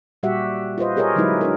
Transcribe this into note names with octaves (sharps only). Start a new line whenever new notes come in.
A#2 G3 F#4 G4 E5 F#5
F4 B4 C5 D#5
G4 G#4 A#4 C#5 D#5
D3 F#3 G#3 D#4 E4 B4
D4 F#4 A#4